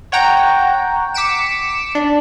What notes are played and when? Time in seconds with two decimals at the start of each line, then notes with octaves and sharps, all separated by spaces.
0.12 C#5 F#5 G5 A#5
1.14 D6 B6 C#7 D7 E7
1.95 D4